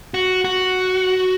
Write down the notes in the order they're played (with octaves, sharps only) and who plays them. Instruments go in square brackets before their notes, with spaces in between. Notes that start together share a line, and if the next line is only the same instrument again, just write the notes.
[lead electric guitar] F#4
F#4